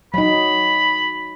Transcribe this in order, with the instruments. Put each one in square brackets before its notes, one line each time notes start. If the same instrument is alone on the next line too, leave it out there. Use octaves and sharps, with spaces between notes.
[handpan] F#3 D#4 [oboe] B5